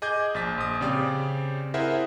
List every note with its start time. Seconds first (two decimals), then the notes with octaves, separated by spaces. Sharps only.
0.02 G#4 D#5 D6 G6 G#6
0.34 A#1 A6 B6
0.58 A#1 D#6
0.81 C#3 C4 G4 D5
1.74 E4 G#4 A#4 C5 E5 F#5